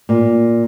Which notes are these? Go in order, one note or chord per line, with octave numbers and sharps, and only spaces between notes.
A#2